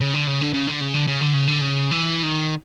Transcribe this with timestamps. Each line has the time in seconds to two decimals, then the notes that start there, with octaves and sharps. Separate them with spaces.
0.01 C#3
0.14 D3
0.27 C#3
0.41 D3
0.54 C#3
0.67 D3
0.81 C#3
0.94 D3
1.07 C#3
1.21 D3
1.33 C#3
1.47 D3
1.61 C#3
1.91 E3
2.23 D#3